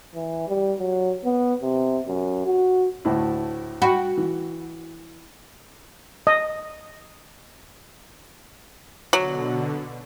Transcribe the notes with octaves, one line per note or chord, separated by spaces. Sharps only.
E3
G3
F#3
B3
C3
F#2
F#4
D2 A2 E4
F#4 F#5 G5 B5
E3
D#5
B2 D3 F#3